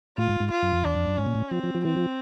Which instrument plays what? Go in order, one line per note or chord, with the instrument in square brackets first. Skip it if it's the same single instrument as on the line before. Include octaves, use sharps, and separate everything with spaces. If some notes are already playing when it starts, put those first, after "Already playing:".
[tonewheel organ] A2 [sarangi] F4
[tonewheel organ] G#2
G#2
[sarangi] F4
[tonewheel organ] F#2
F2
[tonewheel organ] E2 [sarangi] D4
[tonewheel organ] F2
F#2
[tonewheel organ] G#2 [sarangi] C#4
[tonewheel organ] A#2
A2
[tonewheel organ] F3 [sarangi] C4
[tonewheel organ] F3
F3
[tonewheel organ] E3 [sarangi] C4
[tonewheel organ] F3